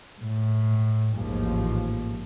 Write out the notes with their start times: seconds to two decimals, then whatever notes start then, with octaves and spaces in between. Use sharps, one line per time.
0.17 A2
1.15 A1 D#2 G#2 F3